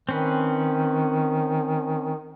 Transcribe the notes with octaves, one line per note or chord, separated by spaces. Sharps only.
D#3 C4 C#4 B4